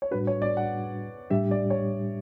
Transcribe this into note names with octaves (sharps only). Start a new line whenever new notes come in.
C#5
A2 G3 D4 F#4 B4
C#5
D5
F#5
A2 G3 D4 G4 E5
D5
C#5